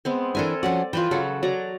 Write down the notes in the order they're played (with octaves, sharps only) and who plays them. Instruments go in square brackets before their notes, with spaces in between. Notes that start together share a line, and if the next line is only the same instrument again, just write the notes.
[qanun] G#3 B3 C4
[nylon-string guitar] E3 D4 E4 [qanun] A4 A#4 G#5
[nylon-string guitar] F3 C#4 F#4 [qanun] D5
[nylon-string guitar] E3 [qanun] F4 B4 G5
[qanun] C#3 F#3 F#4 [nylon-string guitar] A4
[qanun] F#3 D5 A#5